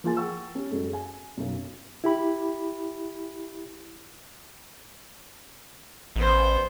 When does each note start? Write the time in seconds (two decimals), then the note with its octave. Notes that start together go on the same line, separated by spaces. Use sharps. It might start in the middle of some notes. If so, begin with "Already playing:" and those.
0.04 F3 A#3 F4 G#4 G#5 A6
0.17 F#5 G5 C#6 E6
0.55 C#4 G4
0.70 F#2 G#3 A4
0.93 G#5
1.37 B1 F#2
2.04 E4 G4 B5
6.16 A1 B3 C5